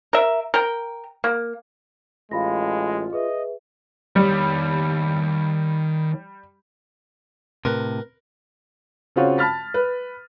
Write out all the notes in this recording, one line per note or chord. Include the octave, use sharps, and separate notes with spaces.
A#4 E5
A#4 G5
A#3
A1 G#3 F4 F5 B5 A#6
G#4 B4 D#5 E5
D#3 G3 C#5
A2 C3 A#4 B4
C#3 C4 F4 F#4 C#5
A5 B5 F6 A6 B6
B4